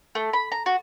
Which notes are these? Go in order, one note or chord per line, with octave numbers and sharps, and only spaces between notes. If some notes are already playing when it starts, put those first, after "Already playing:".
A3
B5
A#5
F#4